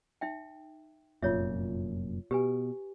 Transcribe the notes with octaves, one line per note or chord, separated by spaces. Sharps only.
D#4 E5 G5
F1 F#2 A#2 F4 C#5 E5
B2 G4 B4 G#5